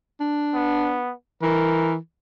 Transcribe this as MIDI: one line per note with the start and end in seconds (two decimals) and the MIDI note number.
0.20 0.98 62
0.54 1.13 59
1.42 1.96 52
1.42 1.95 70